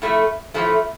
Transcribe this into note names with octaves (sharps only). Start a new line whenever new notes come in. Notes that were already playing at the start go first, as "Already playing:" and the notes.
A2 F3 A3
A2 F3 A3